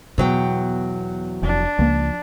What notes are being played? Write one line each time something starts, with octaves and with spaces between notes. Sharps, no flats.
E2 B2 F#3 G5
F1 D4
C#2 F3 A#3